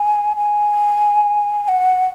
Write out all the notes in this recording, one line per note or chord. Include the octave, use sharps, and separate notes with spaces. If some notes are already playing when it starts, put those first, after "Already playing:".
Already playing: G#5
G#5
G#5
F#5